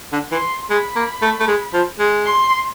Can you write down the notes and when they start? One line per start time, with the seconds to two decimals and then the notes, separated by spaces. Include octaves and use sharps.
0.12 D3
0.32 E3 C6
0.70 G#3 B5
0.96 A#3
1.22 A3
1.40 A3
1.48 G#3
1.73 F3
1.99 G#3
2.26 C6